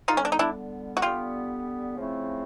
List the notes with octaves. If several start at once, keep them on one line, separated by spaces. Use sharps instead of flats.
D3 G3 B3 D#4 F4
C#4
D4
D#4
D4 E4
F#4
D3 G3 B3 F4 G4
C#3 F3 A3 C4 E4